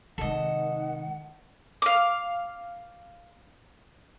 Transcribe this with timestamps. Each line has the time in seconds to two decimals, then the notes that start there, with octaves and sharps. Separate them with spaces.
0.18 C3 D#3 G#3 A4 D#5 F#5
1.82 F5 D6